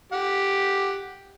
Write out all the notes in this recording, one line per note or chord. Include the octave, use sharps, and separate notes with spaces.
G4 F#5